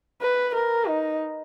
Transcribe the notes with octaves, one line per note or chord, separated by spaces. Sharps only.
B4
A#4
D#4